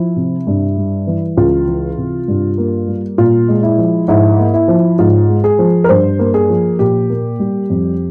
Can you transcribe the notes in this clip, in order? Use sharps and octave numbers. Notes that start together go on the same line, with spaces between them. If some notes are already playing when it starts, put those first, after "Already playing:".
Already playing: F3 E4
C3
G2
G3
E3
C#2 F4
E3
C3
G2
A#3
G3
A#2 F4
G#3
E4
F3
G#2 E4
A#3
E4
F3
G#2 F4
G#3
G#4
F3
A#4
G2 C5
A#3
G#4
F3
A#2 G4
A#3
G3
F2